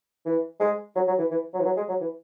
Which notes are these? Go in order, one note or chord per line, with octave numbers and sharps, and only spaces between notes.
E3
G#3
F#3
F#3
E3
E3
F#3
E3
F#3
G#3
F#3
E3